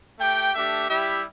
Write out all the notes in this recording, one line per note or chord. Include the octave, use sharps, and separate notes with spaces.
A3 G4 G5
A3 D4 G4 E5
G3 E4 G4 E5